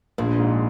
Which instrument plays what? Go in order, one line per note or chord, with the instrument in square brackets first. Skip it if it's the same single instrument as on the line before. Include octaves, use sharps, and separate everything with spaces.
[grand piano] A#1 [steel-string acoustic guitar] A#2
[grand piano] G#2